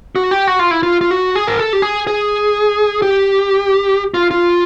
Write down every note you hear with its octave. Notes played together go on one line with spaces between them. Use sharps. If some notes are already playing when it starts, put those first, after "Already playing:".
F#4
G4
F#4
F4
E4
F4
F4
F#4
G#4
A#4
A4
G4
G#4
G#4
G4
F4
F4